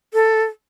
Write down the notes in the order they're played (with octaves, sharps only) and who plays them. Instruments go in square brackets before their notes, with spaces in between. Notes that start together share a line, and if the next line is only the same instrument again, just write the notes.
[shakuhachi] A4